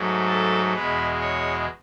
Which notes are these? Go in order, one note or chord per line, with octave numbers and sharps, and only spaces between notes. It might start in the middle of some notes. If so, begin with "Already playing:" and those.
Already playing: G#2 F#3 A3
A4
E2 B2 G#3 B4
C#5